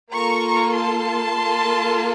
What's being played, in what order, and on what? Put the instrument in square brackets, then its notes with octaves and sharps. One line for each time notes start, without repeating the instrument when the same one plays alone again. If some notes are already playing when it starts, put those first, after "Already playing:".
[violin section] A#3 F4 A4 A#5 C#6
A5 C6
A#3 F4 A4